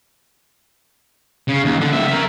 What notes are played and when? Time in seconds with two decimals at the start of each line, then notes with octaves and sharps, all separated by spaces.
1.48 C#3
1.65 D#2
1.80 D3
1.93 C#2 E5
2.08 A#4 E5